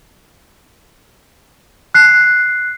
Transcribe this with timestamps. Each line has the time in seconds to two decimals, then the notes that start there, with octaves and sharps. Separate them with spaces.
1.94 F#6 C7